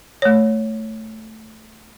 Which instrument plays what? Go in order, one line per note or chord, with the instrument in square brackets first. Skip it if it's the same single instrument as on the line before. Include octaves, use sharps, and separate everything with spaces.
[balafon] A3 C#5